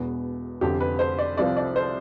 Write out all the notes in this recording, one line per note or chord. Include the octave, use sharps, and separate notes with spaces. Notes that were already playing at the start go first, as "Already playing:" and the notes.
Already playing: E1 E2 B2 B3
F1 F2 D3 G4
B4
C5
D5
C2 C3 F3 C4 D5
D5
C5